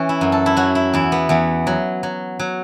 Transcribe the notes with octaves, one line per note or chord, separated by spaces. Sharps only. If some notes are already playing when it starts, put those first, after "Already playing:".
Already playing: E3 C#4
E4
F#2
A4
E4
F#3 F#4
E4
E2 E4
B3
E2 B3
F#3
F#3
F#3